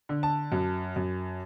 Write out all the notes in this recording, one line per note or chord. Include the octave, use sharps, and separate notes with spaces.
D3
A5
F#2
F#2